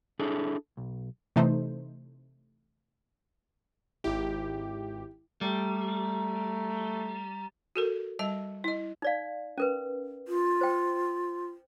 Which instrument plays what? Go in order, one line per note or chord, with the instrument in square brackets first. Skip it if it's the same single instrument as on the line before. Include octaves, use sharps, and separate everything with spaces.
[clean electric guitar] D4 E4 G#4 A4
B1
[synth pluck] C3 E3 A3 D#4 C5
[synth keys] G#1 G4 [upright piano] E4
[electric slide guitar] G3 [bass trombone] A3 [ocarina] A#5
[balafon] F#4 A4 A#4
G3 D#5 A5
E4 D#5
[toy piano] D#4 D5 F5
C#4 A#4 B4
[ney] F4
[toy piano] C5 G5